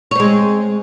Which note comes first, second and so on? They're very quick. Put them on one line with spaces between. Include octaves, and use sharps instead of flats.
C#5 C4 G#3